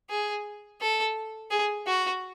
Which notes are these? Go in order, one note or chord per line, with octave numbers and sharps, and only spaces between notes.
G#4
A4
G#4
F#4